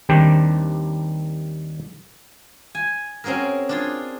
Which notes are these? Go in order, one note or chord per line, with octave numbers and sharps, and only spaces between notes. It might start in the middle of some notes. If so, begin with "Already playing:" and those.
D#2 D#3 G3 C4 D4 G5
G#5
C4 C#4 F#4 G#4 A#4
D4 F4 G#4